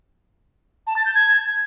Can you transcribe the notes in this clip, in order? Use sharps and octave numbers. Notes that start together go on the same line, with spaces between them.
A5
A6
G6
G#6